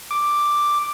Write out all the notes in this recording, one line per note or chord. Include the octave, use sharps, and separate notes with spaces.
D6